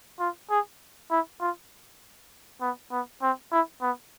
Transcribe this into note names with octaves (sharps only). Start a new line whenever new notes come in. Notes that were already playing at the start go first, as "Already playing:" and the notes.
F4
G#4
E4
F4
B3
B3
C4
E4
B3